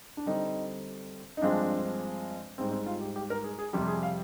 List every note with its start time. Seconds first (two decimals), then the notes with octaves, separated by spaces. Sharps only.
0.17 D4
0.26 D3 G3 C4 D#4
1.37 D#4
1.42 G2 F3 G#3 C4 D4
2.58 G#2 G3 C4
2.72 C4
2.86 F4
3.01 G4
3.16 G4
3.30 A#4
3.44 G#4
3.59 G#4
3.73 F2 C3 G3 G4
3.88 G#4
4.03 F5